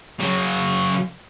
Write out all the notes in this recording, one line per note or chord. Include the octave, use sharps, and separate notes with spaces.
C#3 F#3